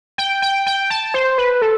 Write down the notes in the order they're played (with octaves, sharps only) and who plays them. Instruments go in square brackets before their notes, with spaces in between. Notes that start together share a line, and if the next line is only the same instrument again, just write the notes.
[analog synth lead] G5
G5
G5
A5
C5
B4
A4